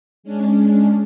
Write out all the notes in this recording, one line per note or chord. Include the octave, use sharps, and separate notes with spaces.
G#3 C#4 D4